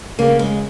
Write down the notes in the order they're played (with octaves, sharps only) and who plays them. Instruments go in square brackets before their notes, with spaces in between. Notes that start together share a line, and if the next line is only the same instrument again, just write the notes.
[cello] C#3 [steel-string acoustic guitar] A#3
[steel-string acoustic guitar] G#3